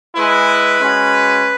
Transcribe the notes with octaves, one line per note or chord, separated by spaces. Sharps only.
G#3 E4 B4
G#3 C#4 F#4